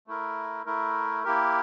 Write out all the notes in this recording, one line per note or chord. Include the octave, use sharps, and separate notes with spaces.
A3 E4 A#4
A3 E4 A#4
A#3 E4 G4 A#4